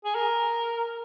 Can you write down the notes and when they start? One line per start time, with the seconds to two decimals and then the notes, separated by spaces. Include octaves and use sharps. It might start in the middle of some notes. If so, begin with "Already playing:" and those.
0.05 G#4
0.15 A#4